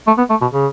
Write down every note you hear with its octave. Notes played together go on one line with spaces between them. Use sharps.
A3
B3
A3
B2
C#3